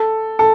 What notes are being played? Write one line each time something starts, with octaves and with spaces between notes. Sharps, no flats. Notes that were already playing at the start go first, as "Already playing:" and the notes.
Already playing: A4
A4